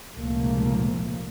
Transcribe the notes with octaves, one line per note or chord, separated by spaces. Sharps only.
F1 C#2 A#2 F3 A3 A#3